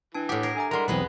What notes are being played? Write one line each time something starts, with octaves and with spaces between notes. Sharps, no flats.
E3 D4 A5
A2 G4 F#5 D6 D#6
A#4 G#6 C7
D4 E5 G#5 A#5
G3 G#3 E4 A#4 F#5 A#5 C6
B1 E2 B3 C4 G#4 B4 D#5